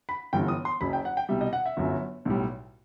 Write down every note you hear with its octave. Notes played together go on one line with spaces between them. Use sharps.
B5
G1 F#2 E3 G3 G5
D#6
C6
F#1 F#2 F#3 B5
G5
F#5
G5
C2 B2 G3 E5
D#5
F#5
E5
G1 F#2 F#3
B1 A2 G3